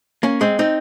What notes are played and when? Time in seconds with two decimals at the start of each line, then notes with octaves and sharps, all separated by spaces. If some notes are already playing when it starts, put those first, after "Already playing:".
0.23 A#3 C#4
0.41 G#3 C4
0.59 C4 D#4